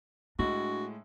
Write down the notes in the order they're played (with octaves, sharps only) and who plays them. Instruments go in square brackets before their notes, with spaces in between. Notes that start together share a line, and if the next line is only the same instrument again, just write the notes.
[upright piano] A2 G#3 [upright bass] D4 [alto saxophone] F#4